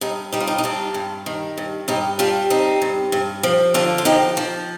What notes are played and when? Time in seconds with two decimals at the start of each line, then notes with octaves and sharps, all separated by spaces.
0.01 G2 D#4
0.33 G3 D#4
0.40 F4
0.47 D#4
0.58 D#4
0.63 G2 D4 F4
0.94 G2
1.26 D#3
1.58 G2
1.88 G2 D#4 G4
2.19 G3 D4 F4
2.50 C4 D#4
2.82 G2
3.12 G2
3.43 F3
3.74 D3 D4 F4
3.98 F4
4.05 F3 D#4 G4
4.37 F3